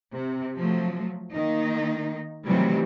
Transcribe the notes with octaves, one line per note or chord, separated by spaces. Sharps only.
C3
F3 F#3 A3
D#3 A#3 D#4
C3 D#3 E3 F#3 G3 A3